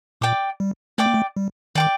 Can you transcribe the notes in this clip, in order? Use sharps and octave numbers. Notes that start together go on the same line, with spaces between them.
A#2 D5 G5 D6
G3
A3 D5 G5 D6
A#3
A3
G3
D#3 D5 G5 D6